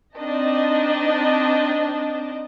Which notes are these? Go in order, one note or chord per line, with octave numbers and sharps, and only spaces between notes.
C4 D4 D#4 D#5 A5